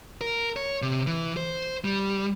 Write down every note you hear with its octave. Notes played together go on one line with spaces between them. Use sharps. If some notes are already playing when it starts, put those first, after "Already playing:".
A#4
C#5
C3
E3
C5
G3